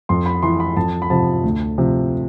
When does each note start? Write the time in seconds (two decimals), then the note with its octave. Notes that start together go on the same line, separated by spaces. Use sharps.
0.09 F2 C6
0.26 B5
0.43 E3 C6
0.60 B5
0.77 F2 A5
1.02 B5
1.10 C3 F3 A5
1.44 D2
1.78 C3 F3